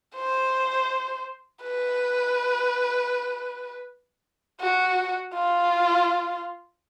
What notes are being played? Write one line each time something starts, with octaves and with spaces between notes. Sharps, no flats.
C5
B4
F#4
F4